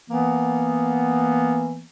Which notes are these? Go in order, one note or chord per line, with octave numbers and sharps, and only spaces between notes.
E3 A#3 B3